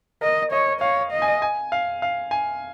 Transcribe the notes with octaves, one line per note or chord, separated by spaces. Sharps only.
A#4 D#5
C#5 D#5
C#5 F5
D#5
G#5
G#5
F5
F5
G#5